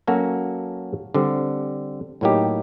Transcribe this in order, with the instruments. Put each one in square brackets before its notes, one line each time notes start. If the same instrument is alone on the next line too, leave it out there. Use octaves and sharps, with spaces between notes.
[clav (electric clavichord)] F#3 A#3 C#4 F#4 A4
D3 G3 C4
A2 F#3 A#3 D#4 G4